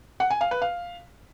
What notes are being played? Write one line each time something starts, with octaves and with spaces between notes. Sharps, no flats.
F#5
G#5
F5
B4
F5